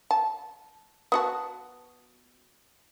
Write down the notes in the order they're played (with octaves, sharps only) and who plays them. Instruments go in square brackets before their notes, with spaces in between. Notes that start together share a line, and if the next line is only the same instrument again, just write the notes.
[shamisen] A5
B3 F#4 A5